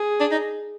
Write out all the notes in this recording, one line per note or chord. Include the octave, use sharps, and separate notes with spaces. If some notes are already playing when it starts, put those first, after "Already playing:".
Already playing: G#4
D4
D#4